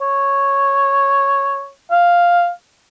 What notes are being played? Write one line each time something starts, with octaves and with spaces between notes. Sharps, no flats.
C#5
F5